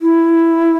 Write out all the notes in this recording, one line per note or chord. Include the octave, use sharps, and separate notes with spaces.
E4